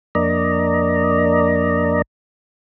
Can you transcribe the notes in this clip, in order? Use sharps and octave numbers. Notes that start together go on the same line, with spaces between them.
F2 A#3 D4 D5 D#5 A#5